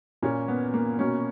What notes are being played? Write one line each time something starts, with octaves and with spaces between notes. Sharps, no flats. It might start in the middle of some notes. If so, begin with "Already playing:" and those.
A#2 A#3 C#4
B3
A#3
B2 A#3 C#4